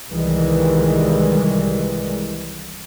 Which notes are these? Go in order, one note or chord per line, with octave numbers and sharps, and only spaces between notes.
C2 D#3 E3 G3 G#3